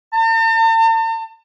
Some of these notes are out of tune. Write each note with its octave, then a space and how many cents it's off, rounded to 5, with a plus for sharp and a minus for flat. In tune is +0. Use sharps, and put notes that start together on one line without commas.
A5 +45